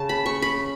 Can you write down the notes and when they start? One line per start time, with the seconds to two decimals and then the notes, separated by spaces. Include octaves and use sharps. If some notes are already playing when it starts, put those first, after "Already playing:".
Already playing: C#3 A5
0.09 B5
0.26 C#6
0.42 B5